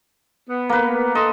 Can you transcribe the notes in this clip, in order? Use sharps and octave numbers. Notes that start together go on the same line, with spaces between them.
B3
A#3 B4
A4 D#5 C6